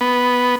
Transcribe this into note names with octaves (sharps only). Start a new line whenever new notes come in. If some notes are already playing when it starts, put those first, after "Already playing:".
B3